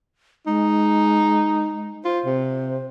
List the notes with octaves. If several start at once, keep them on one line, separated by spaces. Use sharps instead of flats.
G#3 D#4
F4 C5
C3